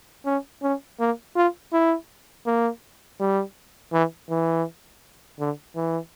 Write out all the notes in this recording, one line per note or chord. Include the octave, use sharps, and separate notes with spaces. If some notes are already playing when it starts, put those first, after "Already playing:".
C#4
C#4
A#3
F4
E4
A#3
G3
E3
E3
D3
E3